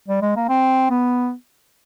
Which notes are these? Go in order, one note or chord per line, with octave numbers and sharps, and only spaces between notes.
G3
G#3
A#3
C4
B3